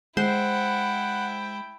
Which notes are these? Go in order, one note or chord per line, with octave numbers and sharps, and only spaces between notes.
G#3 E4 C5 F#5 G5